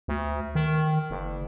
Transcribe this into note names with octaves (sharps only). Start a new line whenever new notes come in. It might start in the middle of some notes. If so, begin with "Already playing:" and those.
D2
D#3
F#1